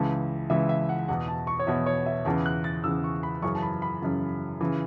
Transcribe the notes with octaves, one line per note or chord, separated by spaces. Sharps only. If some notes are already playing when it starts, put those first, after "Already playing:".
Already playing: C#2 C#3 E3 A5
C#2 C#3 E3 E5
E5
F#5
E2 B2 F#5
A5
C#6
C#5
E2 B2 E5
C#5
E5
E2 C#3 E3 A5
F#6
A6
E2 C#3 E3 E6
C#6
B5
F#2 C#3 E3 C#6
A5
B5
B5
F#2 C#3 E3
C#3 E3